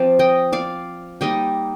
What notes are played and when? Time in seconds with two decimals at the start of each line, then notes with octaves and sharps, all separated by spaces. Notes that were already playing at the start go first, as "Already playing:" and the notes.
Already playing: F3 C4 F4 D5
0.19 D#5 G5
0.53 D5 F5
1.21 G3 A#3 D#4 D#5 G5